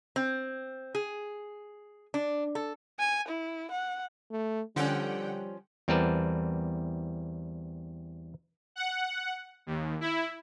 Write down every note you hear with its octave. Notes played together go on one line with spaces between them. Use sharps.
C4
G#4
D4
A4
G#5
E4
F#5
A3
D3 F3 G3 C#4 F#5 G5
E2 G3 C4 A#4 B4 A5
F#5
D#2
E4